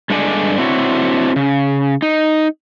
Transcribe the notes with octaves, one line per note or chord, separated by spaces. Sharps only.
G2 G#3 D4 A4 D5 G#5
C4 D4 E4 F#4 A4 C#5
C#3
D#4